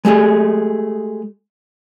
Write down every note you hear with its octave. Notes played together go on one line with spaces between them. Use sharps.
G#3 A3 G4 G#4